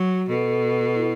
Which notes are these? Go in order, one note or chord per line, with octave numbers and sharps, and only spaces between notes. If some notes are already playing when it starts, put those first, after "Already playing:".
Already playing: F#3 F#4
B2 A4
A4
E4